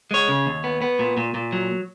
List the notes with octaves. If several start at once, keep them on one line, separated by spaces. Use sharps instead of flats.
G#3 C#5
C#3
D#2
B3
B3
A#2
A#2
A#2
F#3